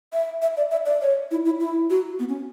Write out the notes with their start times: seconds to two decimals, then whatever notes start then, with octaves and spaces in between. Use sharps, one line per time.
0.13 E5
0.42 E5
0.57 D5
0.71 E5
0.86 D5
1.02 C#5
1.31 E4
1.45 E4
1.60 E4
1.90 F#4
2.19 B3
2.29 C#4